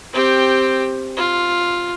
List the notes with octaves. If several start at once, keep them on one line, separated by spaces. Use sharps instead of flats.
C4 G4
F4